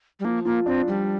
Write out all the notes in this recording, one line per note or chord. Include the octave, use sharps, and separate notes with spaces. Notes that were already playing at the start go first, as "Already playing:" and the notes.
G3
F3 A#3
A#3 F4
C4 D4
F3 G3